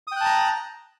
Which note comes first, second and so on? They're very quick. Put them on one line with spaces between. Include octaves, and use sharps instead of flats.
D#6 G5 F#6 A5 A#5